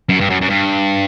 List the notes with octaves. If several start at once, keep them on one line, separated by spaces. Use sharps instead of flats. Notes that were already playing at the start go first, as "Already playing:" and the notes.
F#2
G2
F#2
F#2
G2